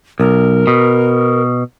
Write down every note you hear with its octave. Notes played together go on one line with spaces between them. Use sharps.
B1 A#4
B2